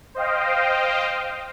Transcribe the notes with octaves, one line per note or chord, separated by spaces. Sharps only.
C5 D#5 F5 G5